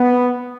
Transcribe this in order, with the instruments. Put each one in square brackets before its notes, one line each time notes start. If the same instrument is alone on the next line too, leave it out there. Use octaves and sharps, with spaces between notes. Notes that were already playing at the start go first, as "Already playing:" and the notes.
Already playing: [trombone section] B3